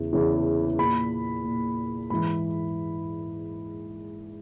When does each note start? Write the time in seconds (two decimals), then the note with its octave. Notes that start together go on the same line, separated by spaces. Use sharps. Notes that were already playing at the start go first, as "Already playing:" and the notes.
Already playing: E2 C#3 E3
0.13 E2 C#3 E3
0.79 A#2 B5
1.44 A#2
2.10 G#2 E3 B5